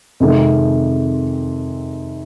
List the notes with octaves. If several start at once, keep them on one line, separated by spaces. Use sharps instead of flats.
F2 C3 D#3 G#3